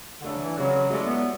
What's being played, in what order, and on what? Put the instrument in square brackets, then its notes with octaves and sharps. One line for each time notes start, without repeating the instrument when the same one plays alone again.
[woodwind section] D3
[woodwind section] C#3 [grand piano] A3 D4 A4
[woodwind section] F#3
E3
[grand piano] C#3 G#3 C#4 [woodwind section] F#3
[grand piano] F#3 A3 E4 A4 D5 [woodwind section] G#3
[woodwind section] B3